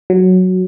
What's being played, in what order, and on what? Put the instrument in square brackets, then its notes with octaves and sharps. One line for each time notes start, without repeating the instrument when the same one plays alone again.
[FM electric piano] F#3